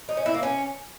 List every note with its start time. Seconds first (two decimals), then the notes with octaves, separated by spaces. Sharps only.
0.09 D#4
0.17 C#4
0.26 E4
0.34 A#3
0.43 C#4